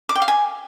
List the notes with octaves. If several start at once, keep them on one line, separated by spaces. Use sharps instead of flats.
D6
G5
F5
G#5